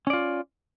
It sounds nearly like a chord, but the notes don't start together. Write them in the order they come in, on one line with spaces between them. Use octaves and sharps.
C#4 D5 F4